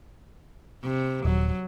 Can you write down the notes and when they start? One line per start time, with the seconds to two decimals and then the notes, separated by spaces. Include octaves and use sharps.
0.83 C3
1.25 D#1 F#3